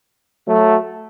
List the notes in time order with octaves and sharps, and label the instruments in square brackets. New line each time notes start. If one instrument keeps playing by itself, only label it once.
[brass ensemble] F#3 A3